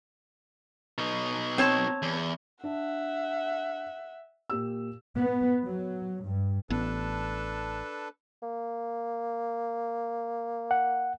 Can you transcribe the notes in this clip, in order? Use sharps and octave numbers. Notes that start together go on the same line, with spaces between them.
B2 D#4
C4 C#5 A5
E2
D4 E5 F#5
A#2 G4 E6
B3
F#3
G2
A1 B3 D4 A4 B4
A#3
F#5